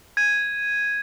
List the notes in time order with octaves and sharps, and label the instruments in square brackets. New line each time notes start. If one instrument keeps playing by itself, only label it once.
[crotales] G#6 D#7